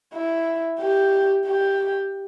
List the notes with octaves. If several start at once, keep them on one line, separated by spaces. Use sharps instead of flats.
E4
G4
G4